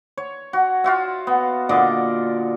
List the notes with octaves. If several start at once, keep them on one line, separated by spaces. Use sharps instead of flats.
C#5
F#4
F4 F#4 E5
B3
A#2 D3 D#5 D6